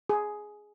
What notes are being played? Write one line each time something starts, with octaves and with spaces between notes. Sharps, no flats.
G#4